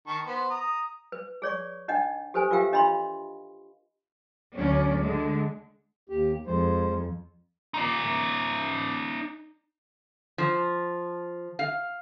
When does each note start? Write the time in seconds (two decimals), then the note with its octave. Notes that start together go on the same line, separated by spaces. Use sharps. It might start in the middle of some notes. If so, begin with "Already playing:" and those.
0.07 D#3 A5 C#6
0.25 B3 C5
0.50 A#5 D#6
1.12 B4
1.42 G#4 C#5 D5 C#6
1.88 D4 D#4 D#5 F#5
2.34 G4 A4 B4 C5 G#5
2.51 F4 G4 A#4 E5 F5 G5
2.72 D4 D#5 F5 B5 C6
4.56 D2 F#3 C#4 D5
4.99 D3 G#3
6.09 D#2 G4
6.47 F2 G#3 C5
7.74 D#4 D5
10.38 F3
11.59 F5